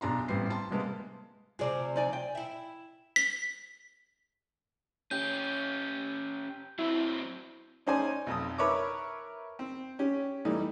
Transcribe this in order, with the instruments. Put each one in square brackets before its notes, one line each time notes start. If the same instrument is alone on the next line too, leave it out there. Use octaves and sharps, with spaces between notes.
[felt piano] B1 D4 A#5 C6
A1 G3 B3 C4 C7
A5 C6
C3 G3 G#3 A#3 B3
[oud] D2 C3 F3 [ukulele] G#4 D5
[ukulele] D#4 D5 G#5
G5
[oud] E4 E5
[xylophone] B6
[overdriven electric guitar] C#4 G4 [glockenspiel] G6
[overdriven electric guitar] F#3 C4 [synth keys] E4
[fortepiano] C#4 D#4 C5 D5 G#5
B1 F2 A5 D#6
A#4 B4 C#5 E5 A5 D6
C4
C#4 G4
E3 G3 A3 D#4